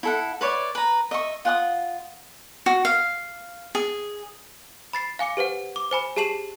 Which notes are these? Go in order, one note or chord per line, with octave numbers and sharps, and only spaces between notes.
E4 A4 F#5
B4 C#5 D5 E5
B4 A#5
D#5 E5 C#6
F4 F#5 G#5 D#6
F#4
F5
G#4
B5 A6 C7
F5 G#5 D6 C#7
G4 B4 C5 F#5
D6
C5 G#5 B5
G4 G#4 A5 C7 E7 F#7